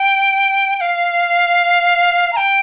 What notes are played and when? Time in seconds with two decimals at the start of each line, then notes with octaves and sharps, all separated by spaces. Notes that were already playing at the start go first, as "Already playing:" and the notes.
Already playing: G5
0.76 G5
0.81 F5
2.33 A#5
2.37 G5